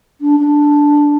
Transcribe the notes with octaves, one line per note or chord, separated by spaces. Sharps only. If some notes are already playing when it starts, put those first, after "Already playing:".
D4
D4